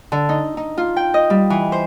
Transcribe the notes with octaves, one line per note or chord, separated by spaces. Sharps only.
D3
D#4
D#4
F4
G5
D#5
G3
E3
C5